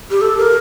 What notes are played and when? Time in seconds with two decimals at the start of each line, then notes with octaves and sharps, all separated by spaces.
0.11 G4
0.21 A4
0.37 A#4